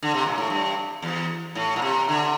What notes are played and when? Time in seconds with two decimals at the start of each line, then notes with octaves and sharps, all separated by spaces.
0.02 D3
0.14 C3
0.26 A#2
0.38 A2
0.50 G2
1.02 E2
1.55 A2
1.76 A#2
1.82 C3
2.09 D3